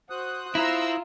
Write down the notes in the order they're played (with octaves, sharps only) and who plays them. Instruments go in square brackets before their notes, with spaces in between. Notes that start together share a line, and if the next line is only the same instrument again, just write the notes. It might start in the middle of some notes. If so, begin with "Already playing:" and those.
[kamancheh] F#4 [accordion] C5 D#6 F#6
[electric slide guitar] E4 [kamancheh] F4 [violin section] A#5 C6 E6